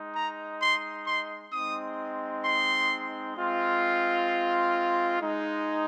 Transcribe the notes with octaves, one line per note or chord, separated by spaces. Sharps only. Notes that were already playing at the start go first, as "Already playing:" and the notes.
Already playing: G#3 D#4
A#5
C6
C6
G#3 C4 D#4 D#6
C6
G#3 C4 F4
C6
G#3 D#4